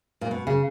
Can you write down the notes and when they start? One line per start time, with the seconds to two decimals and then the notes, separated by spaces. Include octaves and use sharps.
0.21 A#2
0.31 B2
0.47 C#3